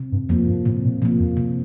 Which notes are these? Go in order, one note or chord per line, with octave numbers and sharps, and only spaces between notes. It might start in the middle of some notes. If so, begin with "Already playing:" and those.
Already playing: C3
G2
F2 F3 A#3
G2
A2 C3
A#2
A#2 F3 A#3
F2
C3